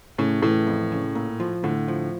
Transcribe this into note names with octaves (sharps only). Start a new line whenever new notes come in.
A2 C#3
A2 E3
F2
C#3
A#2
F3
A2 D3
F3